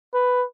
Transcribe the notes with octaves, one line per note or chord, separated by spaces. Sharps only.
B4